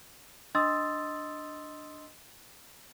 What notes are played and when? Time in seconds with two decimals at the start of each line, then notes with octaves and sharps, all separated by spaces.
0.55 D4 D#5 C6 D#6 E6 A6